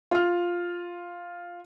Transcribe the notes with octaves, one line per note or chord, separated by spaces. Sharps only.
F4 F6